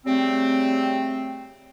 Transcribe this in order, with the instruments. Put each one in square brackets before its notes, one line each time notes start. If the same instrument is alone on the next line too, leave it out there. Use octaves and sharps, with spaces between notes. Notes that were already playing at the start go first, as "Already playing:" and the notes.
[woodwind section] C#3 G3 A3 C4